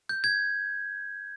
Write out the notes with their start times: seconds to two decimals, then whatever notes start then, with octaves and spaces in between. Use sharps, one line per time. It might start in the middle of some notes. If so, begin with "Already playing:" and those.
0.09 G6
0.24 G#6